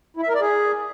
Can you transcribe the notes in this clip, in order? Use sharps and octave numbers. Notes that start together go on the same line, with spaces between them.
E4
E5
A#4
D5
G#4